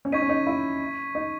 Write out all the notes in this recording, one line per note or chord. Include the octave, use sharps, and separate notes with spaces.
C#4
D#4 C#6 G#6 B6 D#7
C#4
D#4
E4
D#4